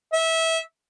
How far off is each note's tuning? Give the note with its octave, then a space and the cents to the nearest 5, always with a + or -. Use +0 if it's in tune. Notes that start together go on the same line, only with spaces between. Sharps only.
E5 -20